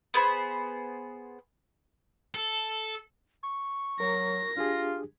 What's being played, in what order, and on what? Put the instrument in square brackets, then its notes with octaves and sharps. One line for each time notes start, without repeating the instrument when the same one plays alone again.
[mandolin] B3 G#4 C5 B5
[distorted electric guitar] A4
[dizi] C#6
[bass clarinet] F#3 [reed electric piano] A#4 [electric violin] A#6
[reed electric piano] D4 G4 G#4 [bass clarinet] F4